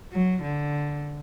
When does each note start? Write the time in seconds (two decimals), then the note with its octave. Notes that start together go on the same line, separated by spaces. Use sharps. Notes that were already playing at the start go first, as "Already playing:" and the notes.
0.13 F#3
0.43 D3